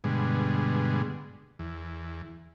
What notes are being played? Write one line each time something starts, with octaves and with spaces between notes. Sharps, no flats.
G2 B2 D3 G#3
E2